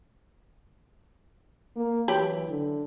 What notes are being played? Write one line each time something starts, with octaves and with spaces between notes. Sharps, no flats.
A#3
E3 F#3 G4 B5
D3